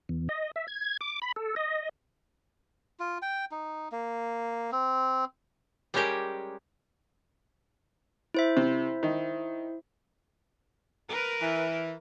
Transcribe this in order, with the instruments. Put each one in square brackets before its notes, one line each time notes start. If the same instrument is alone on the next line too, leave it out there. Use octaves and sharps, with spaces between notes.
[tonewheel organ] E2
D#5
E5
G#6
D6
B5
A4
D#5
[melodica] F4
G5
D#4
A#3
C4
[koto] G3 G#3 C#4 G4 A#4
[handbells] E4 C5 E5
[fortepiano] C3
D#3
[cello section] A#4 B4
[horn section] E3